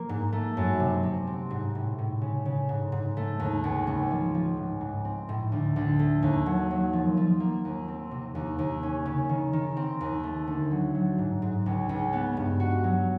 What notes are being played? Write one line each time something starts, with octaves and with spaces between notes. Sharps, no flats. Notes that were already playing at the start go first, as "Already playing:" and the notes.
Already playing: F3 A#3
G#2
A3
F#2
C3
C3
C4
G#2
A2
A2
C#3
C#3
G#2
G#2
A3
D#2
C#2
C#2
F3
F3
G#2
G#2
C4
A2
D2
D2
A3
D#2
F#3
F#3
F3
F3
A#3
D#2
C4
C3
D#2
D#2
C#4
C#3
D#3
D#3
C4
D#2
A3
D2
F#3
F#3
G#2
G#2
C#2
C#2
B3
G2
F#4
F#3